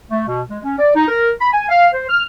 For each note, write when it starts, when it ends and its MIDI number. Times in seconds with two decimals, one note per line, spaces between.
0.10 0.24 57
0.28 0.41 47
0.50 0.59 56
0.64 0.77 61
0.79 0.93 74
0.94 1.06 63
1.08 1.29 70
1.39 1.52 83
1.52 1.64 80
1.69 1.87 77
1.92 2.07 72
2.09 2.23 89